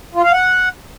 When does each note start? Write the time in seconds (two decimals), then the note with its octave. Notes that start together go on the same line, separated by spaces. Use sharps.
0.14 F4
0.23 F5
0.32 F#5